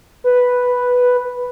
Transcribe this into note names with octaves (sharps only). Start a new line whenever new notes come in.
B4